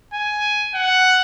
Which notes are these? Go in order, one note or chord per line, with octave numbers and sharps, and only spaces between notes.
G#5
F#5